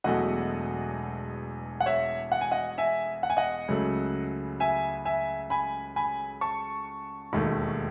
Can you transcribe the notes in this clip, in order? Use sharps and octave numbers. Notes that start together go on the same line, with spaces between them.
E1 E2 B2 F#3 A3 D#5 F#5
F#5
C#5 E5
F#5
G#5
D#5 F#5
E5 G#5
F#5
G#5
D#5 F#5
C#2 C#3 F#3 A3
E5 G#5
E5 G#5
G#5 B5
G#5 B5
A5 C#6
E1 D#2 D#3 A3